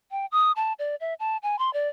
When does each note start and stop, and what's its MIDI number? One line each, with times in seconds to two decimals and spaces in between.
0.11 0.26 79
0.32 0.52 87
0.56 0.73 81
0.79 0.95 74
1.00 1.14 76
1.20 1.37 81
1.43 1.58 80
1.59 1.72 84
1.73 1.89 74